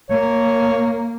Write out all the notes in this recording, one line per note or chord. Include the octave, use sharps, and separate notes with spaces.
A#3 C#5